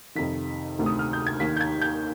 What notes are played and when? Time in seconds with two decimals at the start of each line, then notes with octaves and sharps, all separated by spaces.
0.15 F2 C3 D#3 B6
0.79 D2 C3 D#3
0.86 D#6
0.99 F6
1.13 G6
1.27 G#6
1.40 D#2 D#3 B6
1.57 G6
1.61 G#6
1.82 G6